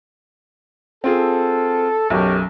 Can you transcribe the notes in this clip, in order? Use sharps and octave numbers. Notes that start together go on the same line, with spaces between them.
C4 F4 G#4 A4
B1 F#2 G4 A#4 C#5